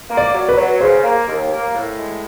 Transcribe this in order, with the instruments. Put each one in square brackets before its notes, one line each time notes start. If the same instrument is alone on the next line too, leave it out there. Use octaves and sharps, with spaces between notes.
[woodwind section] A#3
[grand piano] D5
[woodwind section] F#3
[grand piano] B4
[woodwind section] F#3
[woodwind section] C#3 [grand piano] C5
[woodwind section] A#3
D#2
A#3
A2
G#3